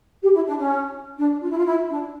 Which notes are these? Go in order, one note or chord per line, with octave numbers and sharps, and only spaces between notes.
G4
E4
D4
C#4
D4
F4
E4
F4
E4
D4